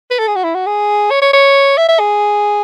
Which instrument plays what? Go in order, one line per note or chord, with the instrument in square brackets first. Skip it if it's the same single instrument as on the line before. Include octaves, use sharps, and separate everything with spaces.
[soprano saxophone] B4
A4
G#4
F#4
E4
F#4
G#4
C#5
C#5
C#5
E5
E5
G#4